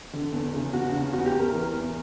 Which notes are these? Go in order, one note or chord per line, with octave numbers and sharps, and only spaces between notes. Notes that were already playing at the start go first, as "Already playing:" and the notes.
D3
E2
C#3
E2 F#4
C#3
E2 F#4
G4
E2
A#4
E3
E2